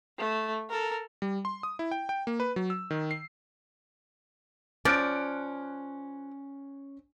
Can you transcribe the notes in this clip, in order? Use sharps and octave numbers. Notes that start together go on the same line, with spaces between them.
A3
A4 A#4
G3
C6
D#6
E4
G5
G5
A#3
B4
F#3
E6
D#3
C7
F3 C#4 D5 F6 F#6 D7